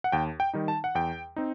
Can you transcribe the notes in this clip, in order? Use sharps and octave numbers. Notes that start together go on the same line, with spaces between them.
F#5
D#2 G5
G5
D#3 G3 D#4
A5
F#5
E2 G5
C4 D#4